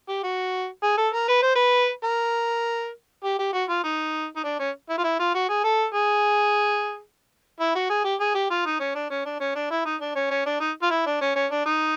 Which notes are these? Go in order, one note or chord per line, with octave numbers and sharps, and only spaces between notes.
G4
F#4
G#4
A4
A#4
B4
C5
B4
A#4
G4
G4
F#4
F4
D#4
D#4
D4
C#4
E4
F4
E4
F4
F#4
G#4
A4
G#4
E4
F#4
G#4
G4
G#4
G4
F4
D#4
C#4
D4
C#4
D4
C#4
D4
E4
D#4
D4
C#4
C#4
D4
D#4
F4
E4
D4
C#4
C#4
D4
D#4